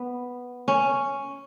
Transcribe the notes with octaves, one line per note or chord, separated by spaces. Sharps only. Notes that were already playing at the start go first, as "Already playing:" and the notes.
Already playing: B3
C#4